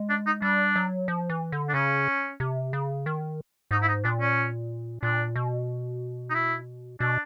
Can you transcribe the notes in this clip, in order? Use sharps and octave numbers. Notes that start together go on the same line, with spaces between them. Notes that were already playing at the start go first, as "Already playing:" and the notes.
Already playing: G#3
D4
D#4
G3 D4
F#3
F3
E3
D3
D4
C#3 C#4
C3
C#3
D#3
G#2 D#4
E4
D#4
A#2 D4
C#4
A#2 D4
B2
D#4
E4
B2 D4